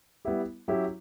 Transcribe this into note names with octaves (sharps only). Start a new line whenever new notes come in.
G3 B3 E4 G4
F#3 C#4 E4 G4